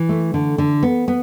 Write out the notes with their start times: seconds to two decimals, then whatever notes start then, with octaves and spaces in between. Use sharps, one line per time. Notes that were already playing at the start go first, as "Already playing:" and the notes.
Already playing: E3
0.09 A3
0.34 D3
0.58 D3
0.83 B3
1.08 B3